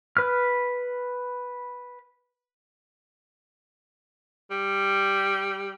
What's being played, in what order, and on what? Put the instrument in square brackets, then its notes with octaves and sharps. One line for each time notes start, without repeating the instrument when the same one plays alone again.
[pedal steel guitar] B4 F6
[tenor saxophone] G3